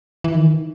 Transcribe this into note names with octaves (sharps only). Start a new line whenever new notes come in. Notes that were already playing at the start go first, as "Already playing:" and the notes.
E3
D#3